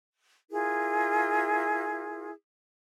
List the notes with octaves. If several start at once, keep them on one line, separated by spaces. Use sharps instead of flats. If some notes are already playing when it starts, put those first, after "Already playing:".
E4 F4 G#4 A#4